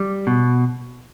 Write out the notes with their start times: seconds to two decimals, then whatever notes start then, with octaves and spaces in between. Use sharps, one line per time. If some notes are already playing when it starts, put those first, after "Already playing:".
Already playing: G3
0.27 B2